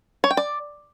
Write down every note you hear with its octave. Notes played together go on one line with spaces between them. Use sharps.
C#5
G5
D5